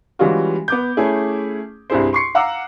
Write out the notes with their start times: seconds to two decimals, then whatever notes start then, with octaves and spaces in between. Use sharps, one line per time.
0.19 E3 G3 G#3 C#4 F4 F#4
0.68 B3 D6 G6
0.97 A3 C#4 E4 G#4
1.90 C2 G2 E4 G#4 C5
2.13 C6 C#6 C7 C#7
2.35 F5 F#5 A#5 D6 E6